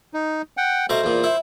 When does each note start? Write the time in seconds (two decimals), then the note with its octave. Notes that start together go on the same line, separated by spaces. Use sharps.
0.14 D#4
0.57 F#5 G5
0.89 B2 A3 C5 A#5
1.03 E2 A#2
1.24 E4